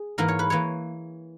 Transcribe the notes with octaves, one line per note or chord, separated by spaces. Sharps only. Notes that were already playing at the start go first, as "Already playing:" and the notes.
Already playing: G#4
G#2 E3 A#3 A#4
C#5
B4
E3 A#3 C#5